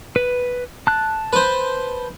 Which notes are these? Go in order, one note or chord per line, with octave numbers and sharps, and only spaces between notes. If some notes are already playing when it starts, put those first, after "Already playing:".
B4
A5 F#6
B4 C5